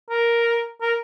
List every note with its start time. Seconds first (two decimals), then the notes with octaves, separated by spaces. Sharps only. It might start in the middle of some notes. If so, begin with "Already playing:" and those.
0.10 A#4
0.81 A#4